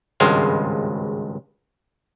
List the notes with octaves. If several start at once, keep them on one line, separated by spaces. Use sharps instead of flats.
G#1 C#2 G2 G#3 C5 F5